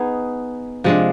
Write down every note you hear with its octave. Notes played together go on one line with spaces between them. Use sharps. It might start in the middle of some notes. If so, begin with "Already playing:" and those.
Already playing: B3 D#4 G#4
C3 F3 G#3 D4